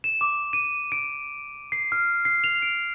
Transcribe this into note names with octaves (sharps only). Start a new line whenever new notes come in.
E7
D6
D#7
D7
C7
F6
C7
F7
D7